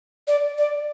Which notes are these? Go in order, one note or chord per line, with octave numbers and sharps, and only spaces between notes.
D5
D5